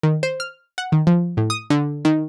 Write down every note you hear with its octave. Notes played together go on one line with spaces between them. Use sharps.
D#3
C5
F6
F#5
D#3
F3
A2
D#6
D3
D#3